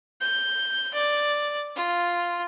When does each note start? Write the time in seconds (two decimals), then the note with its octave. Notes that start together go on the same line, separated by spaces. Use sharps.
0.21 G6
0.94 D5
1.75 F4